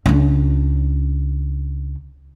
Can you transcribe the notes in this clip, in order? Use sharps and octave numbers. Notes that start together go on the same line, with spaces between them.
C#2 D4